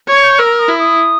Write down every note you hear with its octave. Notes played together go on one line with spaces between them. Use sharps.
C#5 G#6
G6
A#4 E6
D#6
E4
D#6